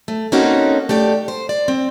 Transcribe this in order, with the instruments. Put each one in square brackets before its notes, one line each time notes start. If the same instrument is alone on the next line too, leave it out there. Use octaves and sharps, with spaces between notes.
[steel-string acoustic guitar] A3
A#3 C4 C#4 D#4 F#4 A4
A3 G4 D5
C5
D5
C4